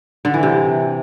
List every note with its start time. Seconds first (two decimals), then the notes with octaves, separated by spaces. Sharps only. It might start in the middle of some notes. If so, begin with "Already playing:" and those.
0.25 D3
0.34 E3
0.43 C3